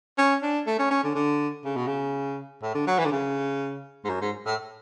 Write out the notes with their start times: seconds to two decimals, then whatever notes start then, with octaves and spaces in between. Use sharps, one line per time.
0.18 C#4
0.42 D4
0.66 A3
0.79 C#4
0.91 C#4
1.04 D3
1.15 D3
1.64 C#3
1.76 B2
1.87 C#3
2.62 A2
2.74 D3
2.87 F#3
2.99 E3
3.05 D3
3.12 C#3
4.04 G#2
4.09 F#2
4.21 G#2
4.46 A2